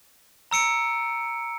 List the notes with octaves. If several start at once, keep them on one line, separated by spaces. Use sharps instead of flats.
A#5 E6 C#7 D7